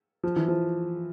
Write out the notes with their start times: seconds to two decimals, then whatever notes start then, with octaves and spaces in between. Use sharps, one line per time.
0.23 F3
0.36 E3
0.48 F3